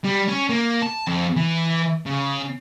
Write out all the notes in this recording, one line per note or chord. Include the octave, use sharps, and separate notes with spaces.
G3
C#4
A#3
A5
F2
E3
C#3